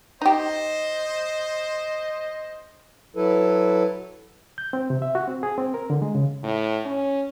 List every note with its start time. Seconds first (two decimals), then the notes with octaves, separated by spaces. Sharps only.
0.22 D#4 G4 C5 D#5
3.16 F#3 E4 A4 B4
4.58 G6
4.73 C4
4.90 C3
5.02 E5
5.15 F#4
5.28 C4
5.43 G#4
5.58 C4
5.74 A#4
5.90 D3
6.02 G#3
6.15 C#3
6.43 A2
6.85 C#4